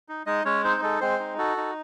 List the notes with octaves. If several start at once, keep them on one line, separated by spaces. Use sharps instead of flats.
D#4
G#3 D#4 D#5
G#3 C#4 C#5
C4 D#4 C5
G#3 A4
G#3 C4 C5
D#4
F#4 A4
D#4